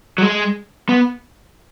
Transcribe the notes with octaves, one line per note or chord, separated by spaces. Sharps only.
F#3
G#3
B3